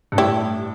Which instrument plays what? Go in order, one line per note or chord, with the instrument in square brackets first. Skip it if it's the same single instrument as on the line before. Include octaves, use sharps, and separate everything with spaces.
[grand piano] G2
[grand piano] A2 [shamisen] E4 G4